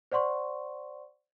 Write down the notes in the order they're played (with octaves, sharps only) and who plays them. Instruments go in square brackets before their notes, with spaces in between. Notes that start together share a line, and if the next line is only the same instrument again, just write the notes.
[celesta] C5 D5 F#5 C6 C#6